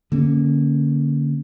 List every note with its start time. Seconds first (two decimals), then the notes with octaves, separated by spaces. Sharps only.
0.12 D3 A#3 C#4